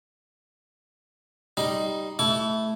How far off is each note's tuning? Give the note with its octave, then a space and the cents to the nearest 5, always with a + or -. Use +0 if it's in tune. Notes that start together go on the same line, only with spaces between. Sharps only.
G3 +0 D#4 +0 C6 +0
A3 +0 E4 +0 C#6 +45